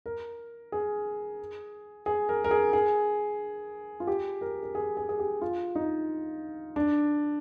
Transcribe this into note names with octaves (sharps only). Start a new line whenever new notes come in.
A#4
G#4
G#4
A#4
A#4
G#4
G#4
F4
G4
A#4
A#4
G#4
G#4
G#4
G4
F4
D#4
D4